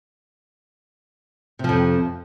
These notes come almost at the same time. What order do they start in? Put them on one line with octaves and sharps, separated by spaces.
C3 F3 F2